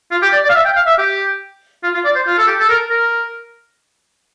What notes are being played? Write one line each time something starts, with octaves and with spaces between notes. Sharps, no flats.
F4
G4
D5
D5
F5
E5
G5
F5
E5
G4
F4
F4
D5
C5
F4
A4
G4
A4
A#4
A#4